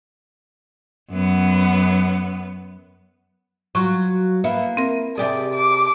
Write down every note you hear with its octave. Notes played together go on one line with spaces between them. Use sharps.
F#2 B3
F#3 F4 C#6
A#3 B3 E4
C4 A#4
C3 G4 G#4 D5
D6